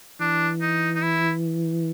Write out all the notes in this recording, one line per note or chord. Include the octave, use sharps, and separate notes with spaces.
E3 D4
D#4
D#4
E4